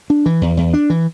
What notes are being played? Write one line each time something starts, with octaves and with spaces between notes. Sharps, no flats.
D4
E3
E2
E2
D4
E3